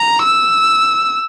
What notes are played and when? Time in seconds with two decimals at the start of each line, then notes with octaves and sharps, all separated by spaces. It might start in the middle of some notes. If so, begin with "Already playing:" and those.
Already playing: A#5
0.24 E6